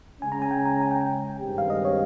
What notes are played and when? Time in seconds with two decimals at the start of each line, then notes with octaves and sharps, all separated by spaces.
0.22 C#3 G#3 C#4 G#5
0.32 A#5
0.42 G#5
0.51 G5
0.65 A#5
0.81 G#5
0.91 G5
1.40 G2 D#3 G#3 C4 G4
1.58 F5
1.70 D#5
1.85 C#5